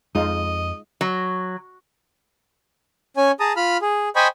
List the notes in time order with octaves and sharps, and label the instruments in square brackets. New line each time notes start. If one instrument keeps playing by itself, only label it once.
[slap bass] F2 [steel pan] G#3 D#4 F4 [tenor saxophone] D#5
[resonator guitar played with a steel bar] F#3
[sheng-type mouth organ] C#4 C#5 G#5
G#4 A5 A#5 D#6
F4 B5 F6
G#4
C5 D#5 G5 G#5 B5 C#6